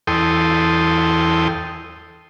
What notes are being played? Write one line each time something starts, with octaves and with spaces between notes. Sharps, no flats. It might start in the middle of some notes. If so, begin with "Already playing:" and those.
E2 A4 G5 C6 D#6